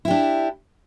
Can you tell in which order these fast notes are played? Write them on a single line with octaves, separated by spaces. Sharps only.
E4 G4 D4